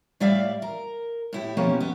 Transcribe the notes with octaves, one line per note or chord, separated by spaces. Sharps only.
A2 G3 D5 E5 F5
A#4
A2 E4 G4
B2 F3 A#3 C#4 G4
B3